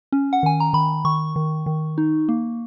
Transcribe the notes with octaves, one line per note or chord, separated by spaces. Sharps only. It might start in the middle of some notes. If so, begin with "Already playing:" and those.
C#4
F#5
D#3 G#5
A#5
D#3 B5
D#3 C#6
D#3
D#3
D#4
A#3